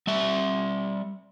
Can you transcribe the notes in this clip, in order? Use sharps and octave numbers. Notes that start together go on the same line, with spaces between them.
G3 E5